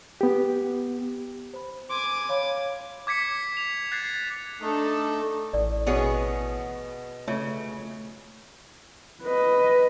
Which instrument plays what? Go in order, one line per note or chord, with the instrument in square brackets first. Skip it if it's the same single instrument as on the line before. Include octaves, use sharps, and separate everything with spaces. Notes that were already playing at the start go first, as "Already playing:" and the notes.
[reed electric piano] B3 G4
[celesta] C5 B5
[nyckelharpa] G#5 D6 [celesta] C6
[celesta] C#5 F5 B5
[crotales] D6 G#6 B6 C#7
F7
F#6 G#6 A6 C7
[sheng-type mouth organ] A3 D#4 [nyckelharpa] D4 A4
[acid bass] A1 [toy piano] D5
[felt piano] B2 [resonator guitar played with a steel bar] B3 G#4 C#5
[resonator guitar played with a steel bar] C#3 [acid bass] A3 [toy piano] F4 C#5 E5
[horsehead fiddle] B4 D#5